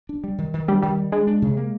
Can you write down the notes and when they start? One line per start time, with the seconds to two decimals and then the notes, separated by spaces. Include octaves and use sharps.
0.09 D4
0.24 G3
0.38 D#3
0.54 D#3
0.68 G3 D4
0.82 D#3 G3
0.97 G3
1.12 G#3 D4
1.27 D4
1.42 C3
1.57 A#3